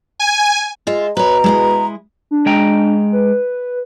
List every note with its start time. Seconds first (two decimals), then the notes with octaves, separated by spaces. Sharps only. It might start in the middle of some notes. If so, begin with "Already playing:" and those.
0.20 G#5
0.87 G#3 F4 E5
1.17 B2 B4 C#5 A#5
1.44 G#3 E4 D#5
2.31 D4
2.46 G#3 G5 A#5
3.12 B4